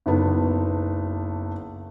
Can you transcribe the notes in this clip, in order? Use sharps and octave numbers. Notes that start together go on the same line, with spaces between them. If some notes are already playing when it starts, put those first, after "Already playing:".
F#1 B1 B3